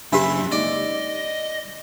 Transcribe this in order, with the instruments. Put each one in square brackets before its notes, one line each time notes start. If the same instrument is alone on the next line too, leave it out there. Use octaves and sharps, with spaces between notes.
[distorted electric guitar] F#2 C#3 [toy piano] D4 G4 [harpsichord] E4 B4 E5
[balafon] G#3 A#3 D#4 [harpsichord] D5 [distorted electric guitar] D#5